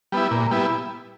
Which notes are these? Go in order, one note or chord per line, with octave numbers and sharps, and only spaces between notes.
G3 B3 E4
A#2
G3 B3 E4